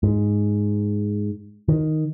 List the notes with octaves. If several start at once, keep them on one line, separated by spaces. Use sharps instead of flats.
G#2
D#3